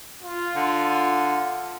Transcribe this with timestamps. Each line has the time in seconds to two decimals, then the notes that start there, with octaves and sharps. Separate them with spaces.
0.22 F4
0.56 D3